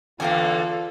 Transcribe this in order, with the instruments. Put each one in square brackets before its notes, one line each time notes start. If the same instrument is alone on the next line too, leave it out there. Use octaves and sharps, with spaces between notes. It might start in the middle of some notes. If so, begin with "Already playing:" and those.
[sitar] E2 D3 A#3 [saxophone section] F4 [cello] A4 [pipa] F5 G5 G#5